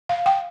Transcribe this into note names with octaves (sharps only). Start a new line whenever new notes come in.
F5
G5